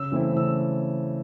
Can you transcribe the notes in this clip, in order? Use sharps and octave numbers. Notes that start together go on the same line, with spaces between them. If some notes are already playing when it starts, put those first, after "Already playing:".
Already playing: C#3 E6
E3 A3 C4 E4
C#3 E6